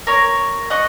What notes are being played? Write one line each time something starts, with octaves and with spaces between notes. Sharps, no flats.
A#4 C#5
D#5 F#5 C#6